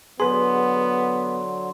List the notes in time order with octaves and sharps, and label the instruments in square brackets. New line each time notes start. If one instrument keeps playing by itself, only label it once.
[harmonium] D3 F#3 [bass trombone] B3 [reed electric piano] G#4 B4 [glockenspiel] C6